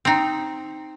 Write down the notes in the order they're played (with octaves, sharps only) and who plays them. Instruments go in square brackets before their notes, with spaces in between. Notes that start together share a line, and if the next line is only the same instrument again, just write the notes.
[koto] C4 D#4